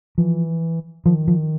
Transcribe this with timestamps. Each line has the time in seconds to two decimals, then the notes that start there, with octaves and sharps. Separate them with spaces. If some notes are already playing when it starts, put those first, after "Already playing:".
0.18 E3 F3
1.05 D#3 F3
1.28 F3